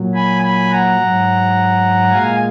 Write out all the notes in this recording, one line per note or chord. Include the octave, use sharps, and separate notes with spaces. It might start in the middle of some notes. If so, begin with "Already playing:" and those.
Already playing: A#2 F#3
G#5 B5
G#5 B5
F#5 A#5
G#2 F#3
A#2 G#3 F5 G#5